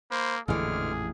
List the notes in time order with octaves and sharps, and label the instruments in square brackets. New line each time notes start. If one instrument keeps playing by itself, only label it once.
[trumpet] A#3 [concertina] C5 B5
[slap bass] A1 F2 A#2 [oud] D3 E3 [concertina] G#3 F6 [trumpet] G#4